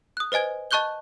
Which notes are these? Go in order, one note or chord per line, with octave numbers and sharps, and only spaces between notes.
D#6 F#6
B4 C5 D#5 G#5 G#6
D#5 A5 C#6 F#6 G6 G7